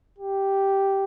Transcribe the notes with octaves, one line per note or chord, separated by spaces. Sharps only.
G4